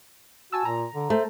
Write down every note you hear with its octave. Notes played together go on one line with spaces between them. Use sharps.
F#4 G#5 A5 E6
A#2 A#5
D3
A3 C5